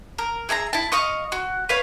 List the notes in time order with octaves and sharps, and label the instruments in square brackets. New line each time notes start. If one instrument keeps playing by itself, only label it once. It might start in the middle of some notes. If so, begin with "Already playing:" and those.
[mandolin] A#4
G#4 E5 A5 A#5
E4 A5
D#5 F5 C#6 D#6
F#4
B4 C#5 F5